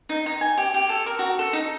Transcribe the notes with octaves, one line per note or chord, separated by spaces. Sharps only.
D#4
D#4
G#5
G4
G4
A4
A#4
F#4
A4
D#4